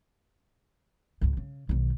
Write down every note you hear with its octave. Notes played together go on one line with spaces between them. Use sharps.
C#2 G#2
C#3
B1 D#3